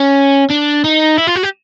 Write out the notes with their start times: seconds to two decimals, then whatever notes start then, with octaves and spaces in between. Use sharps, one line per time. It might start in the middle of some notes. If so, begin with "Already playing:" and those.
Already playing: C#4
0.50 D4
0.84 D#4
1.18 E4
1.27 F4
1.36 F#4
1.43 G4